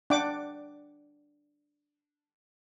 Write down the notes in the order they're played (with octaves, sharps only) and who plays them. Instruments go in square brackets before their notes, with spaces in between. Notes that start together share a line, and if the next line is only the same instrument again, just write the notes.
[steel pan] D4 F#5 G5 D6